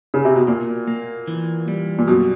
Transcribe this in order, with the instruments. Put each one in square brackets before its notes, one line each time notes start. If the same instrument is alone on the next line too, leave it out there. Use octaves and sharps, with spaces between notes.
[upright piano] C#3
C3
B2
[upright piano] A#2 [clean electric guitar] A#3
[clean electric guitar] A#3
E3
G3
[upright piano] A#2
[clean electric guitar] F#2 [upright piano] B2